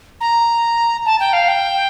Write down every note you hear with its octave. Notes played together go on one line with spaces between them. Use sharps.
A#5
A5
G5
F5
G5